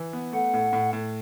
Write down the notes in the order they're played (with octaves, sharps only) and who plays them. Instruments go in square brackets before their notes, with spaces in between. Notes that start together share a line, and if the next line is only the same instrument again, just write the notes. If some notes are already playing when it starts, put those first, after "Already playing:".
Already playing: [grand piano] E3
B3
[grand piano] A3 [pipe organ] F#5
[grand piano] A2
A2
A2